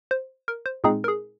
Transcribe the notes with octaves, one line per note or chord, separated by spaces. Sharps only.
C5
A#4
C5
A#2 G#3 C4 D#4 G#4
A#4
G#4